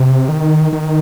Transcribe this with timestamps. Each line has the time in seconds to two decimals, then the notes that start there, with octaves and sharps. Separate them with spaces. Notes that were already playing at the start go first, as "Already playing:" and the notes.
Already playing: C3
0.29 D#3
0.73 D#3